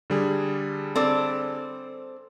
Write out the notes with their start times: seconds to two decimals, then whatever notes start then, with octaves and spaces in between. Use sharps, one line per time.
0.10 D3 G3 G#4
0.96 C4 A4 D5